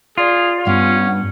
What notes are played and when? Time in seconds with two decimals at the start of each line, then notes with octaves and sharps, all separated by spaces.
0.18 F4 G#4 D5
0.67 G2 B3 C#4